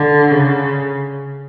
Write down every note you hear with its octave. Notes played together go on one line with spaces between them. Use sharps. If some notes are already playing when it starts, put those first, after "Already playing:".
Already playing: D3
C#3